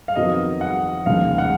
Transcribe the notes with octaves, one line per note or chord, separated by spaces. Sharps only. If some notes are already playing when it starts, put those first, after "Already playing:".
F5
F2 D#3 F#3 B3 D#5
F#5
F1 D#2 C#3 G#3 F5
F#5